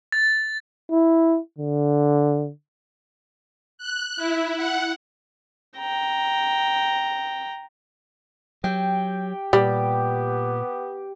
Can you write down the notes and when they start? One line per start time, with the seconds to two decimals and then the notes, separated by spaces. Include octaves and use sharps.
0.12 A6
0.91 E4
1.58 D3
3.78 F#6
4.17 E4
4.57 F#5
5.78 G5 A#5
8.64 F#3 G4 G5
9.53 A#2 G3 B3 G4